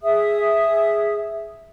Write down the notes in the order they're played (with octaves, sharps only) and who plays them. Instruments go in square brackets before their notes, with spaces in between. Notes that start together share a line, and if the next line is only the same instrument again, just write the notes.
[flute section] G#4 E5 D#6